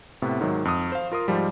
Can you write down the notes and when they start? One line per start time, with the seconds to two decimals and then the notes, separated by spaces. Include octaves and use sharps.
0.22 A2 C3 B3
0.41 G#2 D#3 F#3
0.65 F2 D#6
0.92 C5 F5
1.12 F4 A#4 C6 D#6
1.28 G#2 F3 G3